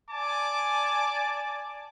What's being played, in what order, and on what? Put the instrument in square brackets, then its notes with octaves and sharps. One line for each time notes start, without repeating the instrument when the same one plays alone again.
[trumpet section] D5 G#5 A5 D6